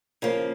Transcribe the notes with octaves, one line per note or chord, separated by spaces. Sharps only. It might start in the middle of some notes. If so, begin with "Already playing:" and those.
C#3 F3 A#3